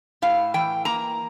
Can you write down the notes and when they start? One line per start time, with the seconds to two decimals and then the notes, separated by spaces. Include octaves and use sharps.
0.22 A2 F5
0.54 E3 G5
0.85 A#3 A#5